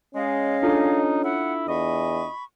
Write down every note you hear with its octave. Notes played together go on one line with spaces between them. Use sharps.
G#3 C#4 G#4 D#5 F5
D4 D#4 F4 A4
E4 F#5
E2 D#5 B5 C#6